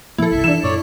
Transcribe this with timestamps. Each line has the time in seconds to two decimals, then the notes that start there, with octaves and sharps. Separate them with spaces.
0.18 A#2 F3 A#3 E4 A4
0.31 G1 C2 E5
0.44 E3 D4 E7
0.63 F#2 A#2 C#5 D5